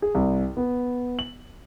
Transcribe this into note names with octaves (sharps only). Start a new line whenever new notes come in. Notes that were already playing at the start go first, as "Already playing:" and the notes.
G#4
C2
B3
F#7